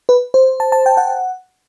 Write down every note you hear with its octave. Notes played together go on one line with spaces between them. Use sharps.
B4
C5
A5
A5
G5
F#5